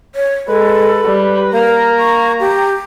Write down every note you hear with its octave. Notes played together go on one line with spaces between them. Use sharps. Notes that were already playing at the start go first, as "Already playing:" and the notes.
C#5
G#3 A4 B4
G3
A#3 A#4 A#5
C#6
G4